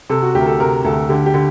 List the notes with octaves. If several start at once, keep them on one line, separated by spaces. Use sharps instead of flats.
C3 A4
F#4
D2 G4
A#4
A4
C3 A#4
D2 A4
D3 G4
G4
D3